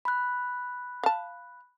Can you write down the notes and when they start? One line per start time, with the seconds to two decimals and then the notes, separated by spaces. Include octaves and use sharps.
0.05 B5 F#6
1.03 F5 A5